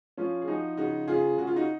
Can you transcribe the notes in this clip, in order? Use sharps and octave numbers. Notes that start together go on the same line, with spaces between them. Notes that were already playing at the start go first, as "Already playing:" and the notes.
F3 C#4 F4
G#4
F3 D#4 F#4
C#3 D#4 F#4
C#3 F4 G#4
C#3 F#4
F4
D#4 F#4